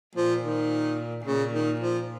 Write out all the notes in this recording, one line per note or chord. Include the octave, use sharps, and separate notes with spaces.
A#2 F3
D#3
A#2 C#3
D#3
F3